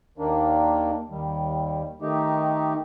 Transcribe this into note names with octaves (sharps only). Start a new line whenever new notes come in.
D#2 D#3 A#3 D4
D#2 D#3 G3
D#3 A3 D#4 G4